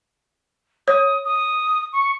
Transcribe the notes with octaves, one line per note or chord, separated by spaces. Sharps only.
C#5 D#6
D#6
C#6